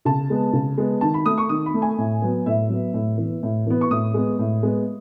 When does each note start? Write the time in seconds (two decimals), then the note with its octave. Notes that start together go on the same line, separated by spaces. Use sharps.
0.05 C#3 A5
0.30 G#3 B3
0.53 C#3
0.78 G#3 B3
1.01 D#3 A5
1.14 B5
1.26 A3 D#6
1.38 C#6
1.49 D#3 D#6
1.66 B5
1.74 A3
1.82 G#5
1.98 A2
2.22 F#3 B3
2.46 A2 E5
2.70 F#3 B3
2.94 A2
3.18 E3
3.23 B3
3.43 A2
3.66 E3 B3
3.81 C#6
3.91 A2 D#6
4.14 G#3 B3
4.39 A2
4.63 G#3 B3